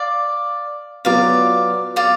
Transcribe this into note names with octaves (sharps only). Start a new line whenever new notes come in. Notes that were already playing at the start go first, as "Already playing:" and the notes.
Already playing: D5 F5
F#3 B3 F4 D5 F5
D5 F5